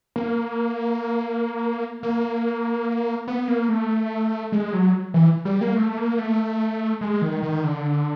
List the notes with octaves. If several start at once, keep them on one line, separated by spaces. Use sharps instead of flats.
A#3
A#3
B3
A#3
A3
G#3
F#3
E3
G3
A#3
A3
A#3
A3
G#3
D#3
D#3
D3